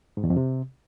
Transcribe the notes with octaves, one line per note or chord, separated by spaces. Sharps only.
G#2
E2
F2
C3